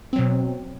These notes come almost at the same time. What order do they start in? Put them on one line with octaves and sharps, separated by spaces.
C4 F#3 B2